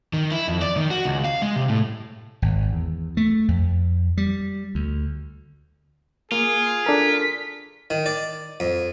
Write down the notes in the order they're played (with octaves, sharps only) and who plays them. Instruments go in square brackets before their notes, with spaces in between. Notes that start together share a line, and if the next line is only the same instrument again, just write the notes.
[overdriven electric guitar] D#3
E4
F2
D5
D#3
F#4
C#2
F5
G#3
C3
A2
[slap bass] G#1
E2
A3
F2
G3
D2
[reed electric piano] A#3 [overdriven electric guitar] F4 [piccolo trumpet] G#4
[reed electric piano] D4 A4 A#4 [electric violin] B6
[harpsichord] D#3
D5
F2